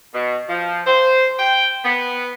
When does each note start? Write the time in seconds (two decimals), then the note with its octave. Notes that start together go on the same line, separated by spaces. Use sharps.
0.14 B2
0.49 F3
0.86 C5
1.39 G5
1.85 B3